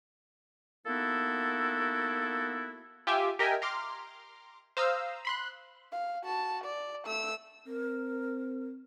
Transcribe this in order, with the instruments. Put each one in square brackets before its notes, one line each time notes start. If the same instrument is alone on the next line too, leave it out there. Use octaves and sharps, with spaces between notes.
[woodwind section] A#3 B3 D#4 E4 F#4 A4
[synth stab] F4 G4 E5 G5 G#5
G4 A#4 D#5 E5 G5 G#5
A#5 C6 D6 F6
C5 F5 A#5 D#6 E6
B5 C6 F#6
[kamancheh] F5
F#4 A5
D5
A3 E6
[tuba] C4 [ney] A#4